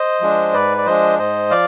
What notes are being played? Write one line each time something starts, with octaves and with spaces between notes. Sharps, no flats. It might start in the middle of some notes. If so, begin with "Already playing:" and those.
Already playing: C5 D#5
F3 G#3 D4
G#2 B4 D5
D5
F3 G#3 D4 C5 D#5
G#2 C5 D#5
F3 D5 F5